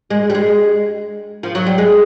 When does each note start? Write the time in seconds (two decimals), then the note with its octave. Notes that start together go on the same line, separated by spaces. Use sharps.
0.10 G#3
0.30 G3
0.35 G#3
1.43 F3
1.55 F#3
1.67 G3
1.78 G#3